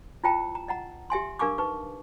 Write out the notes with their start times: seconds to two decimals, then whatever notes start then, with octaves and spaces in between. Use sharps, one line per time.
0.24 E4 F4 C5 G5 A5 A#5
0.55 A#5
0.68 D#5 F#5 A#5
1.10 G4 E5 G#5 C6
1.39 D4 A#4 F5 G#5 C#6 D6
1.58 D#4 B4 C#6